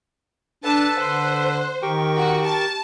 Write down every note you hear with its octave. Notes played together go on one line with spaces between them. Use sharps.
D4 A4 B4 A5
D3 C5 F#6
D#3 G4 A#4 G5 C#6
F#4
A5